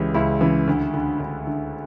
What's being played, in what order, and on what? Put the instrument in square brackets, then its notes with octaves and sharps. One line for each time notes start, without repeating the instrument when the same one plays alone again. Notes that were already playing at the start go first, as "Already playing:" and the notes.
Already playing: [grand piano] C#2 C#3 E3 G4
C#2 E4
C#3 E3
D2
D3
D2
D3